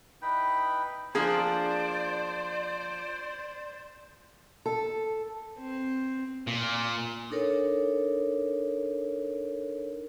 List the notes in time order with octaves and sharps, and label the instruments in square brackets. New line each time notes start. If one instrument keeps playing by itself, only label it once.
[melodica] D#4 E4 B4 G5
[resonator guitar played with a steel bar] F3 A#3 D4 [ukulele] G#4 [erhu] C5 [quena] D5
[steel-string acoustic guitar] A4
[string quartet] C4
[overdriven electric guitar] A#2
[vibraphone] D4 D#4 A4 A#4 C#5